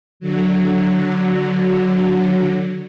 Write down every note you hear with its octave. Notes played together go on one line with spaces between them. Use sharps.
D3 F#3